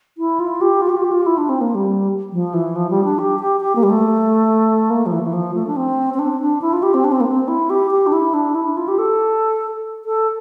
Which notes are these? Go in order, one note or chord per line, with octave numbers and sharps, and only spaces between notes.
E4
F4
G4
F4
G4
F4
G4
F4
E4
D4
C4
A#3
G3
F3
E3
F3
G3
D4
G4
G4
G4
A#3
G3
A3
A#3
F3
E3
E3
F3
A3
D4
C4
C4
D4
D4
E4
F4
G4
C4
D4
C4
A#3
C4
E4
G4
G4
D4
E4
D4
E4
F4
G4
A4
A4